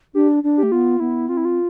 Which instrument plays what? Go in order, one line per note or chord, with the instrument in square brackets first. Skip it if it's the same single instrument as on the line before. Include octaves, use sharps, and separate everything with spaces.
[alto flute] D4 [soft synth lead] G4
[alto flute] D4
[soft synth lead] G4
[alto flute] A3
[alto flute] B3 [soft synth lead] F4
[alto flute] B3 [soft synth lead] E4
[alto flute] C4 [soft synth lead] F4
[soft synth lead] E4
F4